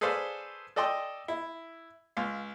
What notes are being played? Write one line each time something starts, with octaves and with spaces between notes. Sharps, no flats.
G#4 A4 B4 C5 D5 F5
A4 D5 D#5 G5 C6
E4
C#2 F5